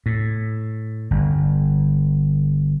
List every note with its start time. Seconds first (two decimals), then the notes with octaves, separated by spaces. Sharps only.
0.06 A2
1.11 G1